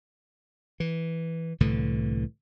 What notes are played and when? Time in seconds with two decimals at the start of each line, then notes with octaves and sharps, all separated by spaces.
0.80 E3
1.60 C2 A2 D3 E3